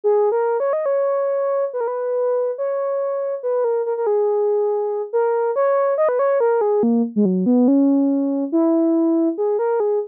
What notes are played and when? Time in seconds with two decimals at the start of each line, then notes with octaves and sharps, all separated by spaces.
0.04 G#4
0.32 A#4
0.60 C#5
0.73 D#5
0.86 C#5
1.74 B4
1.81 A#4
1.88 B4
2.58 C#5
3.43 B4
3.64 A#4
3.86 A#4
3.97 A#4
4.07 G#4
5.13 A#4
5.56 C#5
5.98 D#5
6.09 B4
6.19 C#5
6.40 A#4
6.61 G#4
6.83 A#3
7.16 G#3
7.25 F#3
7.46 B3
7.68 C#4
8.52 E4
9.38 G#4
9.59 A#4
9.80 G#4